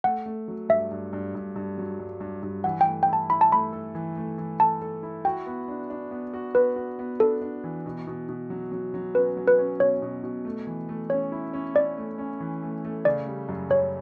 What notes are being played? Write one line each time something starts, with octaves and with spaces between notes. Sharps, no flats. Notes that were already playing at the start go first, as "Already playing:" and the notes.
A3 F#5
A3
F#3
G2 E5
G2
G2
G2
G2
F#3
G2
G2
G2
E3 F#5
A3 G5
G5
E4 A5
E4 B5
A5
A3 B5
A4
E3
A3
E3
A4 A5
A4
E4
F#4 G5
B3
D4
D4
B3
F#4
B3 B4
F#4
B3
D4 A4
D4
E3
B2
B2
B2
F#3
F#3
F#3
C#4 B4
F#3
B4
C#4
B2 C#5
B2
B2
A3
E3
A3
C#4 C#5
E4
C#4
C#4 D5
A3
C#4
E3
A3
A3
C#3 D5
G3
F#2
F#2 C#5